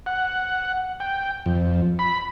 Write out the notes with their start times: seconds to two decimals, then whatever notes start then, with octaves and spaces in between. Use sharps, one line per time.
0.06 F#5
1.00 G5
1.46 F2
1.99 B5